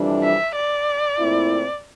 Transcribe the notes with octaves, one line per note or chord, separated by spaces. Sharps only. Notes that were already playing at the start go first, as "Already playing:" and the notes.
Already playing: F2 C3 E3 G3 D4
E5
D5
A#2 A3 C4 E4